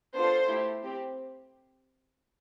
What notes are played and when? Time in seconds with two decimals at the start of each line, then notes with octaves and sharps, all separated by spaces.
0.15 B3 D4 F4 A4 C5
0.49 A3 E4 G4
0.83 C4 G4